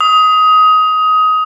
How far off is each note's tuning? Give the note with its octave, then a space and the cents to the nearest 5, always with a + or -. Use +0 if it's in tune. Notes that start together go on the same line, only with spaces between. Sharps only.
D#6 +20